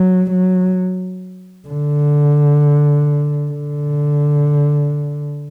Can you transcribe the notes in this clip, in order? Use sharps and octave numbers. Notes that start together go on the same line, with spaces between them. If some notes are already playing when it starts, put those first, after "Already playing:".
Already playing: F#3
F#3
D3
D3